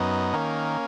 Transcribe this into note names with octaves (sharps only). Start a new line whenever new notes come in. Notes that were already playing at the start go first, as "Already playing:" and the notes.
Already playing: F#2 B3 D#4
D#3 A#3 C#4